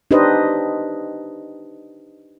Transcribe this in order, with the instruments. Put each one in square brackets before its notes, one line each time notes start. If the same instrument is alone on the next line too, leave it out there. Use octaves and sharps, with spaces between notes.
[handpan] D4 D#4 G4 B4 C5 D#5